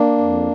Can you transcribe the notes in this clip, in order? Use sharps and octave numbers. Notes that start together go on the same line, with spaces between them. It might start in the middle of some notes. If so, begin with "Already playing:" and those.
Already playing: A#3 D4
F2